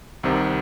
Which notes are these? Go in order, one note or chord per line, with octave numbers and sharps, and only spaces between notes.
C2 C3 D#3